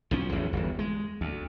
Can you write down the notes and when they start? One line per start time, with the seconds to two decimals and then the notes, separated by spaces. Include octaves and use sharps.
0.11 B1 F3 C#4
0.32 A1 E2 E3 F#3
0.53 G1 E2
0.79 G#3
1.21 D2